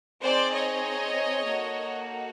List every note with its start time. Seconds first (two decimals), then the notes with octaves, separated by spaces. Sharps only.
0.22 C4 D#4 G#4 C5 D5
0.53 C#5 D#5
1.47 A#3 D#4 F#4 A4